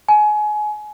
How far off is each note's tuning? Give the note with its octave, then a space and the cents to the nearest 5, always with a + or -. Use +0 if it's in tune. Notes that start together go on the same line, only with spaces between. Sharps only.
G#5 +25